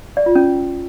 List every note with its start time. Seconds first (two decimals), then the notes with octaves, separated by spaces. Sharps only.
0.17 D5
0.26 F4
0.35 C#4